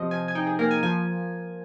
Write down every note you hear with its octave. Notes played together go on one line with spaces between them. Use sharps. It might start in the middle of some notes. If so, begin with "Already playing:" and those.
Already playing: C3 F3 D#5
F3 G#5
G#5
D#4 G5
G#4
A#3 A#4
G#5
F3 G#5